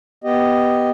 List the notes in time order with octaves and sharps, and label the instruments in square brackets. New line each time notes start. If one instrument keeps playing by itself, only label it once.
[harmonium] B3 G4 D#5